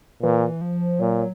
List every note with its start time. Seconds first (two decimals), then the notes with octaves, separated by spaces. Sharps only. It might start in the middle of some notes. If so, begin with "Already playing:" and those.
0.23 A#2 E3
0.61 F3
1.00 A#2 F#3